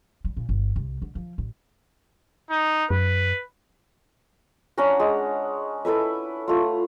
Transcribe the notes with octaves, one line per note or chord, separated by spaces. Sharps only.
G3
A#2
G1
C2
D3
F3
A1
D#4
F#2 B4
C#4 D4 F#5 A#5
G#3
E4 A4 B4 E5
A3 F4